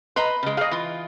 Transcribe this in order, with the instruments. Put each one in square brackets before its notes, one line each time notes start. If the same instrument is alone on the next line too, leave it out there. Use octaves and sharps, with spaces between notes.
[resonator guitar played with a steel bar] B4 D#5 A#5 [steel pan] C6
[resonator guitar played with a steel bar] C#3 G#3
[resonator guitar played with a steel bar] G#4 [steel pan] D#5 F5
[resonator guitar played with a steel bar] E3 F4